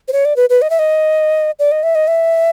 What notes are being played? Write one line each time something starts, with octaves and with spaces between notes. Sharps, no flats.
C5
C#5
D5
B4
B4
D#5
E5
D#5
D5
D#5
E5
D#5
E5